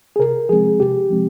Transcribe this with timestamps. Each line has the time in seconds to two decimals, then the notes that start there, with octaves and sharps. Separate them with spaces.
0.16 G#4
0.19 C3 A#4
0.49 F3 G#3 C4 G#4
0.80 C3 G4
1.10 F3 G#3 C4